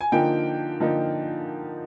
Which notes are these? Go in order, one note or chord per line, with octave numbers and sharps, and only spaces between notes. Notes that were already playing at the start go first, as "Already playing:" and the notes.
G#5
D3 F3 A#3 D#4 G5
D3 F3 A#3 D#4